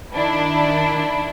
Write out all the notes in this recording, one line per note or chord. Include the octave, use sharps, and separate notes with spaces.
D#3 D4 E4